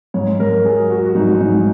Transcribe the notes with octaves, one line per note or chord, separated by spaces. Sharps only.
G#2 C#5
G#2 A#4
F#3 G#4
F#3 F#4
F#4
G#2 D#4
G#2 D#4